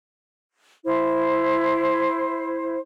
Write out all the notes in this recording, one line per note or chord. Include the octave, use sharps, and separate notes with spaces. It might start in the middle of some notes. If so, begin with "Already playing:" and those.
E4 C5